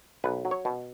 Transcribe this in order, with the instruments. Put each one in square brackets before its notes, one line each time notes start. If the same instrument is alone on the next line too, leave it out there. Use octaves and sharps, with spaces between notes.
[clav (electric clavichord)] B1 B4
F#3
C#5
B2